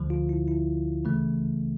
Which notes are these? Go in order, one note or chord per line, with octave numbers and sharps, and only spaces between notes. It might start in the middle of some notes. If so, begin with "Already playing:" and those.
Already playing: D2 D3 F3
F4
E4
E4
C#2 C#3 E3 A3